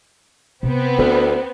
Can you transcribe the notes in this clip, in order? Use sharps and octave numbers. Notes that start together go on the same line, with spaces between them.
C3 B3 C4
D2 E4